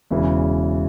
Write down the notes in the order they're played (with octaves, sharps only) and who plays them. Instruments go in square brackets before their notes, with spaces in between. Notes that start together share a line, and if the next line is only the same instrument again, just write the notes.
[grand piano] E1 E2 C#3 E3